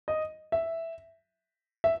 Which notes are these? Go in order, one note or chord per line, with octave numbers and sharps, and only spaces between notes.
D#5
E5
E5